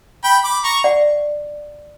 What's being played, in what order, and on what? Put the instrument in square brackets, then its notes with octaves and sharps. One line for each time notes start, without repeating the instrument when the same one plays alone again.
[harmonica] G5 B5
B5 D6
A#5 C#6
[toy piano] D5 F#5